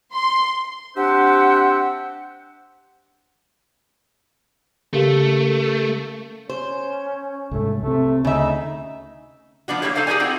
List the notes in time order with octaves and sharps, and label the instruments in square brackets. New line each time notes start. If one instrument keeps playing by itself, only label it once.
[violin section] C6
[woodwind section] C4 D4 G4 C5 E5 F#5
[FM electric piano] C#3 [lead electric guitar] A3 [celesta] G4 A#4 F5
[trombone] C#4 [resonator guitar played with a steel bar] C5
[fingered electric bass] C2 G#2 [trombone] A3
[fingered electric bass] C3 C4 [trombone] A3
[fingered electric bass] D2 [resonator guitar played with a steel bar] C#3 E5 [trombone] D#4
[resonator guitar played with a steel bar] F3 B3 D4 F#4
G3 A#3 E4 G4 A4 C#5
D#4 A4 C5 F5
D#4 G4 G#4 A#4 D5 G#5
C4 D#4 E4 F#4 G4